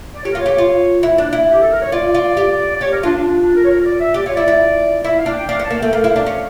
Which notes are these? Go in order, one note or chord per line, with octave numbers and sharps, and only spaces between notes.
D5
G4 C#5
A#4
F4
C#5
G4
F4
E4
D4
E4
G4
A4
A#4
C#5
F4 D5
F4
G4
D5
G4 C#5
A#4
D4 F4
D4
D4
D4
A#4
C#5
A#4
D5
E5
G4 D5
F4 C#5
E4 D5
E4
E4 E5
F5
D4
G5
D4 F5
C#4 A5
A#3
A3 G5
A#3 F5
E4
D4
C#4